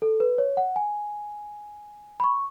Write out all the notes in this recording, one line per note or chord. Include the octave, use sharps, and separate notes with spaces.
A4
B4
C#5
F#5
G#5
B5
C#6